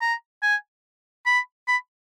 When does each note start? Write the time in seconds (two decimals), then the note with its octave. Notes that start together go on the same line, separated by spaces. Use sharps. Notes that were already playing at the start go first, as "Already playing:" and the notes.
0.01 A#5
0.43 G#5
1.26 B5
1.68 B5